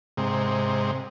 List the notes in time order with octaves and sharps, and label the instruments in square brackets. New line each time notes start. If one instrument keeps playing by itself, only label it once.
[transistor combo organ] G#2 C3